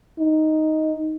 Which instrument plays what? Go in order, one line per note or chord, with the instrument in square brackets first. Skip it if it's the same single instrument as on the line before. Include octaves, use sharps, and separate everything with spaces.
[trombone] D#4